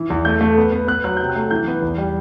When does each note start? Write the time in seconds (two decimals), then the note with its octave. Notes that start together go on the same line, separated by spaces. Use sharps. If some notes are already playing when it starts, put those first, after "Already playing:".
Already playing: E3
0.10 E2
0.25 A3 G6
0.41 A3
0.57 B3
0.72 B3
0.88 B3 F#6
1.04 F#3 F#6
1.17 C3 G6
1.30 F#6
1.36 A3
1.51 E3 G6
1.67 B3
1.82 E2
1.98 G3